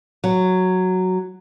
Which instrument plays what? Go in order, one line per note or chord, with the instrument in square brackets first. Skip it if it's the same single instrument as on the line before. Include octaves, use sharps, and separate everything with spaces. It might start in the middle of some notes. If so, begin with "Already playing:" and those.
[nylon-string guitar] F#3